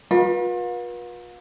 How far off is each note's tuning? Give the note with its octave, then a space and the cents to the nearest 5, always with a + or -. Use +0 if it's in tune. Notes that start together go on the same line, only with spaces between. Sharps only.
F4 +45 B4 -35